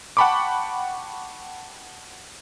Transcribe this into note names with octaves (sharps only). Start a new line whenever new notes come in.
F#5 G5 A5 B5 C#6 D6